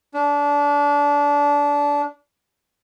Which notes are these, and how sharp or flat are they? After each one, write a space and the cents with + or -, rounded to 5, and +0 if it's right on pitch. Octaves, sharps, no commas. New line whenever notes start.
D4 -25